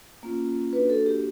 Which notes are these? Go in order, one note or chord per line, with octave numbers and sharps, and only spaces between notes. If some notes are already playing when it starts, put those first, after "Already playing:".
A#3 C#4 F4
A#3 D4 F#4 B4
A4
G4